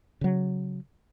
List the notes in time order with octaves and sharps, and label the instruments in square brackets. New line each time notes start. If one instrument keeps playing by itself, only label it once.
[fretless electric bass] C#3 F#3